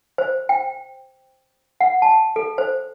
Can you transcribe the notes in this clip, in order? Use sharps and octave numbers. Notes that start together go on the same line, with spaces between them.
C5
G5
F#5
A5
A4
C5